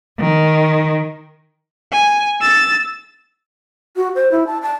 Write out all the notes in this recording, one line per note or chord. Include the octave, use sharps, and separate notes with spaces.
D#3
G#5
E6 A6
F#4
C5
E4
A5
A5